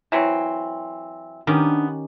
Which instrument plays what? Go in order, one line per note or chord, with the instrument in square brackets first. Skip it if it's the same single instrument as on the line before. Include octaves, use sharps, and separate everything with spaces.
[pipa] E3 F#3 C4
[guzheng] D#3 C#4 G4 [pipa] B3 [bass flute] D4